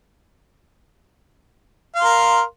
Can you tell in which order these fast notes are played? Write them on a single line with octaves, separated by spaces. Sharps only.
F5 C6 A#4